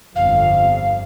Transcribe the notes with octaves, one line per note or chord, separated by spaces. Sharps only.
G1 F2 F5